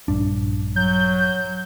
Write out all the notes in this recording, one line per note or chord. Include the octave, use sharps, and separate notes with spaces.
A#1 G2 D4
F#3 G6